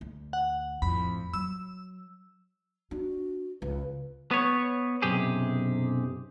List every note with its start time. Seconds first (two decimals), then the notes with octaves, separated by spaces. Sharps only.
0.01 D2
0.33 F#5
0.82 F2 A2 B5
1.34 F#3 E6
2.91 D4 F#4
3.62 C#2 B4
4.31 B3 B4 C#5
5.02 B1 F#2 C3 G4 G#4